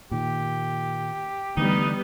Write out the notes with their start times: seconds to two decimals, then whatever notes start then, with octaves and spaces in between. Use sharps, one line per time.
0.11 A#2 D#3 G4
1.57 D3 E3 G3 A3 B3 D#4